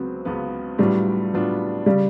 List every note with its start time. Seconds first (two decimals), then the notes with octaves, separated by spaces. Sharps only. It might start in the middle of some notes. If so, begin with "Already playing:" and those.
Already playing: C#2 C#3 F#3 B3 C4
0.25 C#2 C#3 F#3 B3
0.78 A2 F#3 G3 B3 D4 F4
1.32 A2 F#3 B3 D4 F4
1.86 C#3 G3